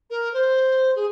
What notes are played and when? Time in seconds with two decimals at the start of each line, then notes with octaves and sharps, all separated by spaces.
0.10 A#4
0.34 C5
0.96 G#4